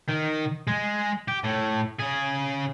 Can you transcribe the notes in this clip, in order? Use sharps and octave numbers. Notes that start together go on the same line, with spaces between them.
D#3
G#3
G4
A2
C#3 G#4